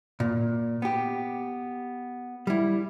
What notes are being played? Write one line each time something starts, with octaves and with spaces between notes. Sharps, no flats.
A#2
B3 G4
G3 E4